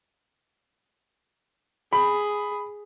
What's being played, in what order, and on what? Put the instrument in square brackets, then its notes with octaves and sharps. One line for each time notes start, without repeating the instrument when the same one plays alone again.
[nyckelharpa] G#4 [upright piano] B5